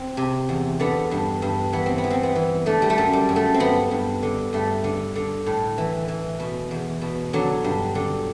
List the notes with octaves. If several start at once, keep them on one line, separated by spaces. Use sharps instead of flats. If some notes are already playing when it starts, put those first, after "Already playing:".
Already playing: C4
C3
E2
D3 B3
G2
G2
E3 B3
C4
B3
E3
C4
B3
E3
D3 A3
G3
A3
F#2
G3
F#2
A3
C4
G2 B3
G2
D3
G2 A3
D3
D3
A2
E3
E3
B2
E2
B2
D3 F#3
G2
D3